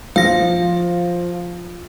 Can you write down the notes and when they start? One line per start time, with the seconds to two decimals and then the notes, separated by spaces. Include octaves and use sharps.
0.16 F3 F5 A#6